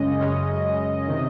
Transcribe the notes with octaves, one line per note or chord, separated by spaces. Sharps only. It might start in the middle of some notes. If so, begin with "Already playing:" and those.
Already playing: F#2 C#3 G#3 C#4 D#5
F#2 C#3 G#3 C#4
C3 D#3